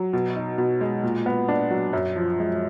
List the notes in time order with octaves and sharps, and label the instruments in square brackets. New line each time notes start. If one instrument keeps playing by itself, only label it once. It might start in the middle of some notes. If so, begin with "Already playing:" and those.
Already playing: [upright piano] F#3
B2
D#4
B2
G#3
A#2
B3
D4
F#3
F#2
F3
G#3